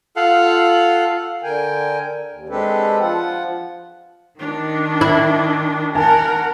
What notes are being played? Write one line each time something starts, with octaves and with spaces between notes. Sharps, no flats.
F4 A4 F5 F#5
D3 A#4 G5 G#5
D#2
G#3 C4 D4 G4 A4 B4
F3 F4 F#5
D#3 D4
E4
A#4 F#5 G#5 A5